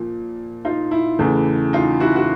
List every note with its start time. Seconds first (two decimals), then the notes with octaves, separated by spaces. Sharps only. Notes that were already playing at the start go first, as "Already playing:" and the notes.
Already playing: A#2 F3
0.65 D#4 F4
0.91 E4
1.19 E2 C#3 E3 A3
1.73 D#4 F4
2.00 E4 F#4
2.16 F#4